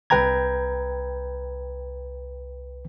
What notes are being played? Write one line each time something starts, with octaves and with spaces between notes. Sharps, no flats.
C2 B4 G5 A#5 G#6